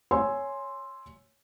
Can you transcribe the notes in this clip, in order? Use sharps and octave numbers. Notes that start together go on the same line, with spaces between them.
C#5 G#5 C6 E6